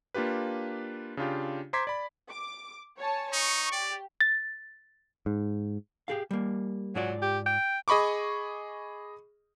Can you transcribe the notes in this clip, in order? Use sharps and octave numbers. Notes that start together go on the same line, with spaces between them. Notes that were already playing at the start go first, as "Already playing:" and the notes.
A#3 D4 F4 G4 B4
C#3 D4 F4 G4
C5 A#5 C6 D6 G#6 B6
D5 B5
D6
C#5 G#5 A5
D#4 C#6
G4 D5
A6
G#2
G4 G#4 F5
G3 A#3
G#2 F#3 F4 D5
G4
G5
G#4 D#5 B5 C#6 D6